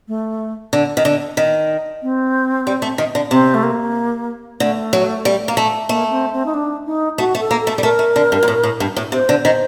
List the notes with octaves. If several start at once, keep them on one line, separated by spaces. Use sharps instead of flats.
A3
D3
D#3
D3
D#3
C4
G3
A3
D#3
D3
C3 C4
A3
A#3
D3 A3
F#3
G3
A#3
A3
A3 A#3
C4
C4
D#4
D4
D#4
A3 F#4
A3
A4
A#3
A4
A3
G3
A3 A#4
A3
D3
G2
A#2
A2
A2
G2
A2
C3 C5
D3
D#3 C5